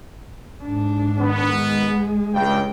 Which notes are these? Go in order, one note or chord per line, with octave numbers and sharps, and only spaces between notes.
G#2 D4
D#3 B3
G#3
C#2 G2 G5